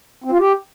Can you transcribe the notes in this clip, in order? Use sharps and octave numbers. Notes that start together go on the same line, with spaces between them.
C4
F4
G4